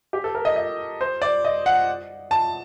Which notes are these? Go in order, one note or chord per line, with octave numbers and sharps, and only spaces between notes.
G4
A4
A#4
D#5
D#5
C5
D5
D#5
F#5
A5